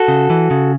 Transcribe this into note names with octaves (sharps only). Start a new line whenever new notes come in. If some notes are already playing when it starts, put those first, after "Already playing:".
Already playing: F#4 A4
C#3
E3
C#3